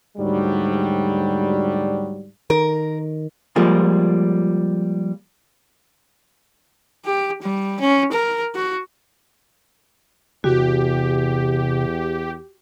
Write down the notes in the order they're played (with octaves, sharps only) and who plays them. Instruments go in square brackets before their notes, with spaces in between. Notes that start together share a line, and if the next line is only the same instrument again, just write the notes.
[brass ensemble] D2 G#2 F#3 G3
[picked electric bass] D#3 [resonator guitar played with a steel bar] A#4
[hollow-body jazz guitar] F3 G3 G#3 A#3 F4 G#4
[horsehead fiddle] G4
G3
C#4
A#4
F#4
[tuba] E2 [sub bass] C3 [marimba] F#4 [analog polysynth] G4